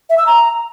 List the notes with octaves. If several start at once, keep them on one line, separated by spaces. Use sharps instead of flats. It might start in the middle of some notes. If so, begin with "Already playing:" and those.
E5
E6
A#5